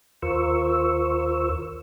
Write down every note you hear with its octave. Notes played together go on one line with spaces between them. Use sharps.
D#2 F4 A#4 C5 C#6 E6